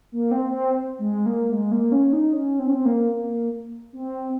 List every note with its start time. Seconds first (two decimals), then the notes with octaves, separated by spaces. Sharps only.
0.12 A#3
0.31 C4
0.51 C4
0.99 G#3
1.26 A#3
1.52 G#3
1.72 A#3
1.92 C#4
2.13 D#4
2.33 C#4
2.59 C4
2.67 C#4
2.74 C4
2.85 A#3
3.13 A#3
3.93 C4